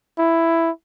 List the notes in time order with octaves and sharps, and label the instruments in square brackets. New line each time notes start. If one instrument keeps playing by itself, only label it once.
[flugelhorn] E4